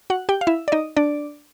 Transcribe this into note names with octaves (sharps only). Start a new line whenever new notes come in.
F#4 F#5
G4 G5
F5
E4 E5
D5
D#4 D#5
D4 D5